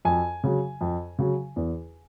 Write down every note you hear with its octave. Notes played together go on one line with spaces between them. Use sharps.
F2 G#5
C#3 F#3
F2
C#3 F#3
E2